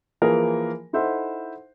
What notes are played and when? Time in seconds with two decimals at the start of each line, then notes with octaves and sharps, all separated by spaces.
0.22 E3 F3 A#3 G#4 A#4
0.93 D#4 E4 A4 C5 E5 F#5